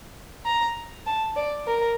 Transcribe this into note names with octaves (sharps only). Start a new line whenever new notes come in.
A#5
A5
D5
A#4